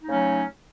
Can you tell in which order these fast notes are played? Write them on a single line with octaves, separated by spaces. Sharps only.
D#4 A3 C#3 C#4 F#3